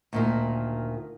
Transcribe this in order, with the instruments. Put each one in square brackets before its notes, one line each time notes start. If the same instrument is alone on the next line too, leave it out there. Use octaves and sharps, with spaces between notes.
[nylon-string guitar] D2 A#2 D#3